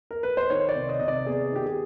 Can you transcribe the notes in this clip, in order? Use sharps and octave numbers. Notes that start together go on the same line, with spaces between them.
A#4
B4
C5
D#3 C#5
D5
C3
D#5
C3 D#5
D5
B3 G#4
D#3 G4
G#4